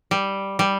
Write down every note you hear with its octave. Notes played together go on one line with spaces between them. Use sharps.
G3
G3